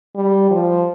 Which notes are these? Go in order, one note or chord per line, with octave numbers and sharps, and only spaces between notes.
G3
F3